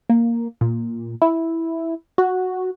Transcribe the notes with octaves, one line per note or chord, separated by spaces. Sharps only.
A#3
A#2
E4
F#4